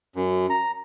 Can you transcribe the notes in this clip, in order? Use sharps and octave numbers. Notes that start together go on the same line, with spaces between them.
F#2
A#5